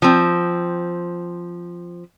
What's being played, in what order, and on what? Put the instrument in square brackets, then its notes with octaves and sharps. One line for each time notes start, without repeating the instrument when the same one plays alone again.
[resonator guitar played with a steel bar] F3 C4